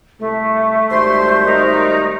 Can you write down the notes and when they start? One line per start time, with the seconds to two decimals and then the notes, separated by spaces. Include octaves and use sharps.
0.19 C2 A3 A4
0.90 G#1 G3 C5 C6
1.45 D#4 A#4